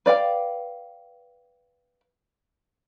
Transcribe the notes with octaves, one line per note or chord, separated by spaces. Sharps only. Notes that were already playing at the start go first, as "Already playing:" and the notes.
B4 D5 F5 G5